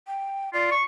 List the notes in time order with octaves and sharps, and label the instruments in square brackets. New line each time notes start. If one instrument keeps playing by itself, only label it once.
[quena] G5
[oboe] F4 [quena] D5
[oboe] C#6